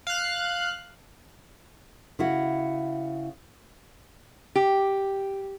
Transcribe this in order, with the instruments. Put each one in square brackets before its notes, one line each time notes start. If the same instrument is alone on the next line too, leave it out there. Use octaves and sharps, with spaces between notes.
[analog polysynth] F5 F#6
[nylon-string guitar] C#3 E4 F#4
[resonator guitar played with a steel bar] G4